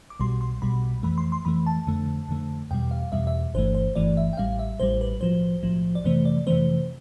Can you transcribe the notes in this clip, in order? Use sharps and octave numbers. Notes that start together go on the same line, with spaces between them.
D6
B1 B2 G3 C6
C6
B1 B2 G3 B5
F2 E3 A3 B5
C6
C6
F2 E3 A3 B5
A5
F2 D3 A3
F2 D3 A3
E2 B2 G3 G5
F5
E2 B2 G3 E5
E5
G1 G2 E3 A3 C5
C5
G1 G2 E3 A3 D5
E5
G5
A1 A2 G3 F5
E5
A1 A2 G3 C5
B4
B1 A2 F3 C5
B1 A2 F3
D5
F2 C3 E3 A3 C5
D5
F2 C3 E3 A3 C5